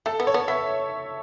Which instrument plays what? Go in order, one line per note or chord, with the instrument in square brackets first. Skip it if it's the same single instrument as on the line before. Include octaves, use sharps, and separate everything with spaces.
[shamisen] A3 [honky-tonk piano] A4
[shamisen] B3
[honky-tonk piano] C#5
[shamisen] B3
[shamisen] B3 [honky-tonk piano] E5